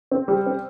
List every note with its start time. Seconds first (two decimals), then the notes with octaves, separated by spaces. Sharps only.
0.11 C4
0.28 G3
0.46 C4